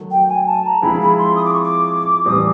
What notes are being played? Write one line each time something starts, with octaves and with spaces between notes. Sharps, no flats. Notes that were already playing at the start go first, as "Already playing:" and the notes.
Already playing: D#3 F#3 A3
G5
G#5
A5
A#5
F3 G#3 C4 E4 G#4 B5
B5
C6
D#6
D6
C#6
D6
A2 E3 G3 C4 D#6